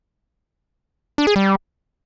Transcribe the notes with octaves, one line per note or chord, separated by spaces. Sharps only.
D4
G#4
G3